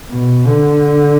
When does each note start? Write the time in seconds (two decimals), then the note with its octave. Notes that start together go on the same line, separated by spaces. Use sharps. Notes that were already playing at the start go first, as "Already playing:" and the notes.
0.11 B2
0.46 D3